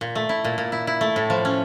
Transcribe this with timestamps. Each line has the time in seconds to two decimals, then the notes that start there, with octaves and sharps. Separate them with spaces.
0.01 A#2
0.15 A3
0.29 E4
0.44 A#2
0.58 A#2
0.72 E4
0.87 E4
1.01 A3
1.16 A2
1.30 F3
1.45 C#4